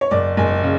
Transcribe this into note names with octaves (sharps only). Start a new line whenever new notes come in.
C#5
F#1 D5
F#1 G#5
C#3